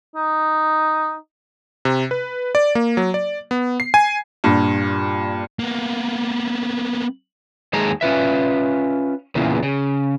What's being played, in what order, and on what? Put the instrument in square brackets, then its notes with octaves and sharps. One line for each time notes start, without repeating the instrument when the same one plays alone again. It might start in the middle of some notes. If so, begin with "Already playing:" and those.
[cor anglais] D#4
[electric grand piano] C3
B4
D5
A#3
F#3
D5
B3
C7
G#5
[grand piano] G2 A#2
[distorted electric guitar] A#3 B3
[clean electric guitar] D#2 G#3 G#4 A4 A#5
C#4 F4 B4 E5
E2 A#2 C#3 E3
C#3